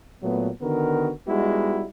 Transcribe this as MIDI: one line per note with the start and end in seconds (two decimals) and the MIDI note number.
0.22 0.49 46
0.22 0.49 54
0.22 0.49 57
0.22 0.49 59
0.62 1.10 50
0.62 1.10 51
0.62 1.10 59
0.62 1.10 66
0.62 1.10 70
1.27 1.85 55
1.27 1.85 56
1.27 1.85 59
1.27 1.85 63
1.27 1.85 64
1.27 1.85 66